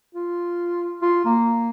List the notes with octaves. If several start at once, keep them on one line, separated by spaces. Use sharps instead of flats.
F4
F4
A#3